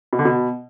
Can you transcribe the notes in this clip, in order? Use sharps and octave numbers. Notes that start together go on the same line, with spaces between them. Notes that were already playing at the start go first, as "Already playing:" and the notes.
B2
D3
B2